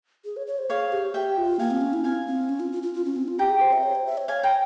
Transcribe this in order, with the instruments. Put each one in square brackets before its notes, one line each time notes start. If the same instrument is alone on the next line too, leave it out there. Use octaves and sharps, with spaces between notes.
[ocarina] G#4
C#5
C#5
C5
[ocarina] G#4 [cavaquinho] C#5 F5
[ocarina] G4
[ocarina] G4 [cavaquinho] E5 G5
[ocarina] F4
[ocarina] A#3 [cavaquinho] F5 G#5
[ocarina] C4
C#4
E4
[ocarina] C4 [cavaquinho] F5 G#5
[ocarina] C4
C#4
F4
F4
F4
F4
C#4
C4
F4
[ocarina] G4 [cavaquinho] G5 A#5
[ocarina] G#4
C5
E5
C#5
C5
E5
C#5
[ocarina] C#5 [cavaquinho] F5 G#5
[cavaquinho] G5 A#5